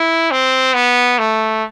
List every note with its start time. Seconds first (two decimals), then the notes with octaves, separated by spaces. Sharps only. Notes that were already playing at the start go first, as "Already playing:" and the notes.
Already playing: E4
0.31 C4
0.74 B3
1.18 A3